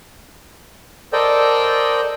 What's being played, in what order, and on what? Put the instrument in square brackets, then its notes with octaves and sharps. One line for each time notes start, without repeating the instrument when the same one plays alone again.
[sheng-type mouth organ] A4 A#4 C5 D5 D#5 G5